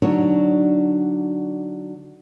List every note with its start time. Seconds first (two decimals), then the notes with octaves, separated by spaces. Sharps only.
0.02 D3 F#3 D4 D#4 C#5